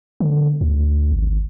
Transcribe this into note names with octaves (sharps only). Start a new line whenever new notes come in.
D3
D2
G#1